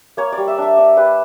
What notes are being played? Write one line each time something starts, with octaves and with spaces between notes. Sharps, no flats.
A#3 C#5
D5
G3
E5
D4 E5
D4 D5
G3 B4